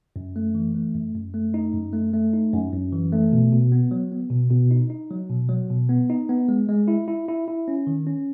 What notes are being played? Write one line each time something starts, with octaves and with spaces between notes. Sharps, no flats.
F#2
A3
E3
A3
F#2
F#2
A3
D#4
F#2
A3
A3
D#4
F#2
F#2
E3
A3
B2
B2
B3
F#3
B3
B2
B2
D#4
D#4
F#3
B2
F#3
B2
B3
D#4
B3
G#3
G#3
E4
E4
E4
E4
C#4
D#3
C#4